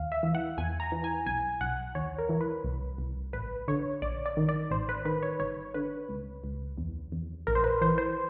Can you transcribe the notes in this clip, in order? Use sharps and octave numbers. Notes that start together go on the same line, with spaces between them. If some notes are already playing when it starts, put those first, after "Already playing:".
Already playing: D#2 F5
E5
E3
F#5
E2 G#5
A#5
E3
G#5
B1 G#5
B1 F#5
D#2 C#5
A#4
E3
B4
C2
C2
A1 B4
D3 C#5
A#1 D5
D5
D#3
D5
A1 C5
B4
D#3 B4
C#5
G1 C#5
D3 B4
C#2
C#2
E2
E2
A#1 A#4
C5
B4
E3 C5
C5